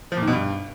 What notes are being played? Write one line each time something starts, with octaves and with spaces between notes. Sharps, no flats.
F3
A#2
D#3
B2
G2